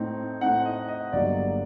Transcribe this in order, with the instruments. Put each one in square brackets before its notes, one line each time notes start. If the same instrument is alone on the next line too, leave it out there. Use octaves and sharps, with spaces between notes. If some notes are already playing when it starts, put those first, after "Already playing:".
Already playing: [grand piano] A2 A3 C4 D#4
A2 A3 C4 D#4 F#5
D#5
D#5
G1 G2 F#3 A#3 D5